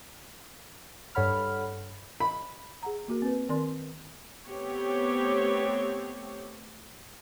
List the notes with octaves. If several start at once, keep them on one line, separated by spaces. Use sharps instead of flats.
G2 A4 C#5 F#5 B5 F6
B5
G#4 F#5 A#5
A#3 F#4 A#4
C4 B4
D#3 C4 A#4 D5 C6
A3 B3 C4 G4 C#5